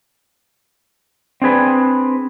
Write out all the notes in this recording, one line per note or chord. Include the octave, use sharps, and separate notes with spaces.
C4 D4 G#4 B4